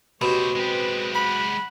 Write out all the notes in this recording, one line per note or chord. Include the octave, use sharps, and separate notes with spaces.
B2 A3 G4 C5 C#5
G#3 C4 G4 B4
F#5 B5